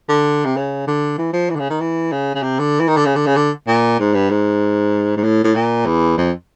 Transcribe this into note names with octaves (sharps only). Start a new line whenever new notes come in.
D3
C3
C#3
D3
E3
F3
E3
D3
C#3
D#3
E3
C#3
C#3
C3
D3
E3
D#3
D3
C#3
D3
C#3
D3
A#2
G#2
G2
G#2
G#2
A2
A2
A#2
E2
F2